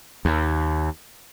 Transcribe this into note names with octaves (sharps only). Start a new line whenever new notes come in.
D#2